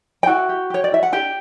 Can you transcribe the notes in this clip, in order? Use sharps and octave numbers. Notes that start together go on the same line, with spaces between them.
G5
E4 F#4 F#5
G4
G4 C#5
D5
E4 E5
F#5
D4 G4 G5